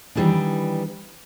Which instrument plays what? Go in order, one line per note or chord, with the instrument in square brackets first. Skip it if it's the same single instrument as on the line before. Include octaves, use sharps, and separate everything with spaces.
[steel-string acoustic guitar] D#3 E3 G3 G#3 B3 D4